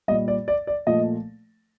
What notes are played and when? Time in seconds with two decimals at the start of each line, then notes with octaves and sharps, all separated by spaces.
0.08 G3 D#5
0.11 A#2
0.28 D5
0.48 D5
0.67 D5
0.87 A#2 F3 A3 D#5